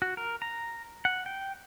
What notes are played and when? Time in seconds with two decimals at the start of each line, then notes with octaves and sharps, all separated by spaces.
0.02 F#4
0.17 A#4
0.42 A#5
1.05 F#5
1.26 G5